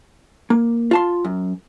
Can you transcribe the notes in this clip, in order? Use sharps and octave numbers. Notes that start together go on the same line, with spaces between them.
A#3
F4 A5 C6
F#2